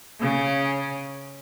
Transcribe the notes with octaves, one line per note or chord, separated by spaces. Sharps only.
C#3 C#4